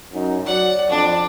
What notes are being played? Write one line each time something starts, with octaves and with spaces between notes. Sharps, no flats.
F#2 D#4
F#3 D5 F#5
F2 D4